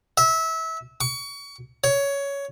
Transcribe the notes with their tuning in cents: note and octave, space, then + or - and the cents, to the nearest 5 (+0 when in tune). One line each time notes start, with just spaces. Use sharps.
E5 -25
C#6 +30
C#5 +15